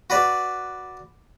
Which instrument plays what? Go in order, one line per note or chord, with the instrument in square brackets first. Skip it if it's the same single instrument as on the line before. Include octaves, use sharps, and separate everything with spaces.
[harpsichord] F#4 B4 D5